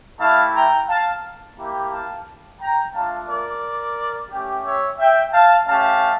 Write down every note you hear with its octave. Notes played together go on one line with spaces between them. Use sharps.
A3 E4 G4 F5 A5
G5 A#5
F5 A5
A#3 E4 G4
F5 A5
G5 A#5
A3 D4 F4 F5 A5
A#4 D5
A3 C#4 G4
C#5 E5
E5 G5
F5 A5
A3 C#4 G4 F5 A5